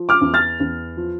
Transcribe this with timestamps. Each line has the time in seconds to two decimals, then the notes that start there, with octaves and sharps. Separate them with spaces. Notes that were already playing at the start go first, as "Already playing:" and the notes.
Already playing: F3
0.09 D6 F6
0.21 E2
0.34 F6 A6
0.60 E2
0.97 F3